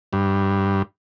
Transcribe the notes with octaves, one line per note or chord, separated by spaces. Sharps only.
G2